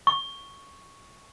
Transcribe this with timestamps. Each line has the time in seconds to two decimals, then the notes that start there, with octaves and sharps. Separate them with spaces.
0.07 C#6